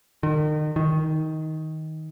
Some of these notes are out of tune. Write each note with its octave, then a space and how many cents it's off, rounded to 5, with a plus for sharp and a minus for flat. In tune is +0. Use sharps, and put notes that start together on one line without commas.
D#3 -35
D#3 +15